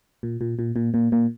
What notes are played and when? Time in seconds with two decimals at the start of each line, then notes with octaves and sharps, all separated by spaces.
0.23 A#2
0.41 A#2
0.59 A#2
0.76 A#2
0.94 A#2
1.12 A#2